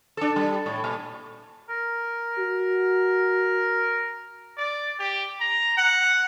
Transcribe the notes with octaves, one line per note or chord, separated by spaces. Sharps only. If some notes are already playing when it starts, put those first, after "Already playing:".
D4 A4
G3
A2
A#2
A#4
F#4
D5
G4
A#5
F#5